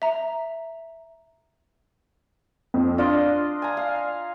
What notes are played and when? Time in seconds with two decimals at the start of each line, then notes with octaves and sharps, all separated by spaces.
0.02 E5 A#5
2.74 F2
2.98 D4 F4 D#5
3.62 G#5 A#5
3.77 F5